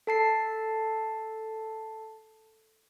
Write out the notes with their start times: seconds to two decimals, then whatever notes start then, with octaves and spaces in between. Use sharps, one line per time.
0.07 A4 A5 C7